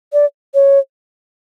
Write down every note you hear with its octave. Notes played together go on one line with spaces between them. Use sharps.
D5
C#5